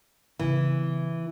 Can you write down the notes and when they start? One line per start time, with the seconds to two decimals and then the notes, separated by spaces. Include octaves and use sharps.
0.39 C#3 E3 B3